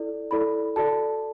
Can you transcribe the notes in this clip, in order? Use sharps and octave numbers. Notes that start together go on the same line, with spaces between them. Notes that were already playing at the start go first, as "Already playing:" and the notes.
Already playing: E4 A4 D5
E4 A4 D5 B5
F#4 A4 D5 A5